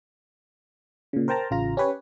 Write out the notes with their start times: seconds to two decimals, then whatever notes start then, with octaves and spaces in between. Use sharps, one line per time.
1.13 A#2 C#3
1.28 A#4 C5 G5 A5 A#5
1.50 A1 C#3 F4 A#5
1.77 C#4 G4 B4 C#5